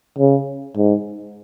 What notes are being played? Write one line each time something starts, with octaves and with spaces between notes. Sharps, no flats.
C#3
G#2